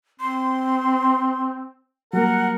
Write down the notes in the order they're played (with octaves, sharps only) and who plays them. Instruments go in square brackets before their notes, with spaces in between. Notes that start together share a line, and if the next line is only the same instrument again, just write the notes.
[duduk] C4 [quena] C6
[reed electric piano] F#3 G3 A#3 [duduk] A#4 [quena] F#5